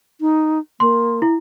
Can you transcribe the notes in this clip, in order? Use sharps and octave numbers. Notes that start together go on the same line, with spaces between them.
D#4
A#3 C6
E4